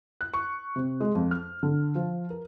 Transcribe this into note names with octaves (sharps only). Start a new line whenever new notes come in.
F#6
C#6
C3
G#3
F2
F6
D3
F3
A#4